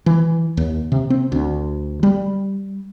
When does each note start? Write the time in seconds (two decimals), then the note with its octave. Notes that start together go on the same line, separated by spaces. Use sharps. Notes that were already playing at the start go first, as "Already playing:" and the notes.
0.06 E3
0.57 D#2
0.92 C3
1.10 C4
1.32 D2
2.03 G3